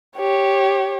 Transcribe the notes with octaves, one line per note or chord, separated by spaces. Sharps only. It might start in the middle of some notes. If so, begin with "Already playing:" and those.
G4 C#5